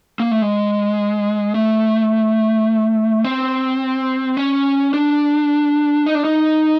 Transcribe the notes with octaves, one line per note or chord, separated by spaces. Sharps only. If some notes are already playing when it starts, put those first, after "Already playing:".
A#3
A3
G#3
A3
C4
C#4
D4
D#4
D4
D#4